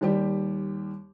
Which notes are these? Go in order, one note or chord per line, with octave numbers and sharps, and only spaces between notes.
D#2 G3 G4 D5